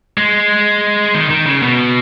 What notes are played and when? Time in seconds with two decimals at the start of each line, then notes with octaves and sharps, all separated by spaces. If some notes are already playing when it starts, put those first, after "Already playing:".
0.18 G#3
1.15 D#3
1.30 D#3
1.46 C#3
1.62 B2